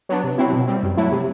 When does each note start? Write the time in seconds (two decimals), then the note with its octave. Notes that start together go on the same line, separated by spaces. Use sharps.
0.09 F#3 B3 D4
0.24 C3
0.38 F#3 C4 E4
0.53 B2
0.67 G3 C4
0.83 F#2
0.97 F#3 A3 E4
1.12 C3